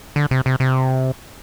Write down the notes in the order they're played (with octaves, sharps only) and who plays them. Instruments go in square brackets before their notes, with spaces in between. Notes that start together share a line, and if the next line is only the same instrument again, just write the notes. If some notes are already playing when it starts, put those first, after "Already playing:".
[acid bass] D3
C3
C3
C3